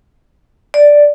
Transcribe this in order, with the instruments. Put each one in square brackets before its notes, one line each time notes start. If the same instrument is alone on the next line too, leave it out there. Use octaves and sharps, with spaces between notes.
[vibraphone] D5